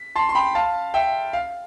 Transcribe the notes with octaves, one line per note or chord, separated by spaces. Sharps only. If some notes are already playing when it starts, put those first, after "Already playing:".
Already playing: B6
A5 C6
C6
G5 B5
F5 A5
E5 G5
F5